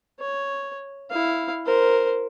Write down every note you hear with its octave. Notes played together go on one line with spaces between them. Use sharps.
C#5
E4 F5
A#4 C5